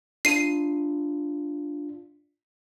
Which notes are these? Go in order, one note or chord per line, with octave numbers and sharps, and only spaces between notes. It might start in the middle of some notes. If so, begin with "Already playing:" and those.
D4 F4 C7 D#7